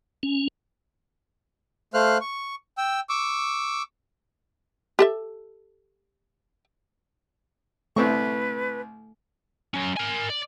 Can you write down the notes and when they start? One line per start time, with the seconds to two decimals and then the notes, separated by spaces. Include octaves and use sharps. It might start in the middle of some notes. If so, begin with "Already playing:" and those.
0.23 C#4
1.94 A3 C5 F5 F6 F#6
2.21 C#6
2.78 G5 E6
3.09 C#6 D6 E6
4.99 G4 A4 E5
7.96 C2 A3 C4 B4 C#6
9.74 F#3 C#4
9.97 A#4 G#5
10.30 D5